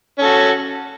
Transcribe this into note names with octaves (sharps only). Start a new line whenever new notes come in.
C#4 F#4 A4